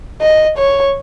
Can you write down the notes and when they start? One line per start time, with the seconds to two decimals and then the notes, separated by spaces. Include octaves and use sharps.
0.21 D#5
0.58 C#5